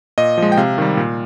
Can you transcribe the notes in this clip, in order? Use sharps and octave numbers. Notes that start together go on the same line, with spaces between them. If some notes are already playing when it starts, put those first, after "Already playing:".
A#2 D#5
F3 G#3
G5
C3 F5
D#3 G3
A#2